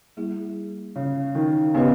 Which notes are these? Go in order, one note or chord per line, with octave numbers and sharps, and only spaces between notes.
G3 A#3 E4 G#4
C#3
D#3
C#3 B3 G4 B4 D#5